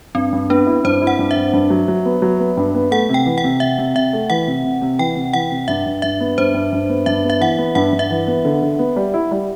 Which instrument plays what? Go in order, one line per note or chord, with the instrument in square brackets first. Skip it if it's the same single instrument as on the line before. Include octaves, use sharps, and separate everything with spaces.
[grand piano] G2 [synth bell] C4
[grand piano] G2
[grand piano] B3 [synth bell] D4
[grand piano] E4
[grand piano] G2 [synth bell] C5
[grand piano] E4
[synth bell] F#5
[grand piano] G2
[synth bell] E5
[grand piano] G2
G2
F#3
F#3
B3
F#3
B3
G2
B3
[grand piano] A3 [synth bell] F#5
[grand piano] C3
[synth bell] G5
[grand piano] E3
[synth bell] F#5
[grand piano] C3
[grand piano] C3 [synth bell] E5
[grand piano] C3
[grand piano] C3 [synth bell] E5
[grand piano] A3
[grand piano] E3 [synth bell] F#5
[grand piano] C3
C3
C3
[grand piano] E3 [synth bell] G5
[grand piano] C3
[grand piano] E3 [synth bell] F#5
[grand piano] C3
[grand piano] G2 [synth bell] E5
[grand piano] G2
[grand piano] G2 [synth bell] E5
[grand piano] B3
[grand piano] G2 [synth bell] C5
[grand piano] G2
G2
B3
[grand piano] G2 [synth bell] E5
[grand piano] B3
[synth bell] E5
[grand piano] E3 [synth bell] F#5
[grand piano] B3
[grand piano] G2 [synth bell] F#5
[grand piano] G2
[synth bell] E5
[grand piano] E3
B3
D3
D3
B3
G3
E4
G3